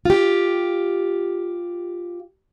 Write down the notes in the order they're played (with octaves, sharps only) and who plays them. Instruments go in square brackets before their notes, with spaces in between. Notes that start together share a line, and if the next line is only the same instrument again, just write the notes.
[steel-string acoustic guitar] F4 G4